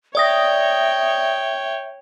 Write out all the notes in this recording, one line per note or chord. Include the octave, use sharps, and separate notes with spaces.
C#5 D5 E5 G5 D#6 A#6